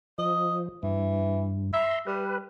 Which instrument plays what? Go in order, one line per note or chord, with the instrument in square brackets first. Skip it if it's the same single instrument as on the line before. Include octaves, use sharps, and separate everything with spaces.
[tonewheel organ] F3 [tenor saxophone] D#5
[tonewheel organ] G2 [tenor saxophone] E3
[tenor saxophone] E5 [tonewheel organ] A#5 C6
[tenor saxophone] G3 [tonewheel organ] B4